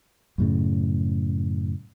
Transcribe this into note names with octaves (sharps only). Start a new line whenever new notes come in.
F#2 A2 C#3